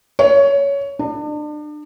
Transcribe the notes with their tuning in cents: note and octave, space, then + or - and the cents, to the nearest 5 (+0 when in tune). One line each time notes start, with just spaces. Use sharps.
C#5 +15
D4 +35